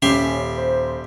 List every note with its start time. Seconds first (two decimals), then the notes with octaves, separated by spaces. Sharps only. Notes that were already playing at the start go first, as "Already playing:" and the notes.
0.02 D#1 C#4 G4 E5 C6
0.57 C5